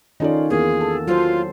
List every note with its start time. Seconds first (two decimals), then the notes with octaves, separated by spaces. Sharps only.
0.20 D#3 C#4 D#4 F4 A4 D5
0.50 E2 A#3 G#4
0.81 A4
1.07 F#3 F4 C5